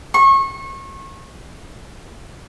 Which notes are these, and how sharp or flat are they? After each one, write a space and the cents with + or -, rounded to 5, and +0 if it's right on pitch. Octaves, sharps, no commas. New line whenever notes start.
C#6 -30